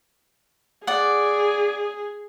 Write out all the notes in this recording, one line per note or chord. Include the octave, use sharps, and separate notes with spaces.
G#4 D5 F#5